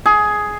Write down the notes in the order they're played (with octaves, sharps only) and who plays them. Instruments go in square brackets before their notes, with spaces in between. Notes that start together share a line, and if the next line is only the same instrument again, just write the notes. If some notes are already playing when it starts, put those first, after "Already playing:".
[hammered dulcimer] G#4